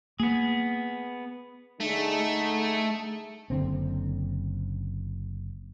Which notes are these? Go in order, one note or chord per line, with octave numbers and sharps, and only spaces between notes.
A#3 B3 G#4
D3 A3 D#4 G#4
F#1 D3 C4